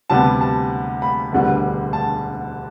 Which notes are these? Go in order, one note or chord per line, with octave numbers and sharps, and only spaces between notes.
D2 C3 G3 B3 A5
A5
B5
E1 D2 D3 G3 B3
A5